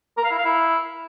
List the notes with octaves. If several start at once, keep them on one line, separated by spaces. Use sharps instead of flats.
A#4
F5
E4
F5
E4